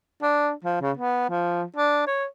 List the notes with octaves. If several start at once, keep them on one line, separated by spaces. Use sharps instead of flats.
D4
F3
C#3
B3
F3
D4
C#5